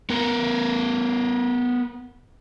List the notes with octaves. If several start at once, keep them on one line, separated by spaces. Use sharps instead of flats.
B3 A#4